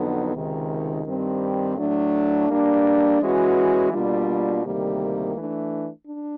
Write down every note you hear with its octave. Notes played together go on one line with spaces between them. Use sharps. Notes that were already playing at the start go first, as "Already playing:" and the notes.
Already playing: F2 D3 F#3 B3 D#4
C#2 C3 D#3
G2 D#3 G3 C4
A2 F#3 A3 D4
G3 A#3 D4
E3 G#3 C#4 F#4 B4
B2 G3 A#3 D4 F4
D2 C3 D#3 G3 A#3
E3 A3 D4
D4